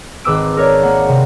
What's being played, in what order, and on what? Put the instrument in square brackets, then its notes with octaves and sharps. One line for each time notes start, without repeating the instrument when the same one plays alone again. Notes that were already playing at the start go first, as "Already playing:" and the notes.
[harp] G#1 B4 D6 E6 D7
A#4 C#5 D5
A#3 F#5
C3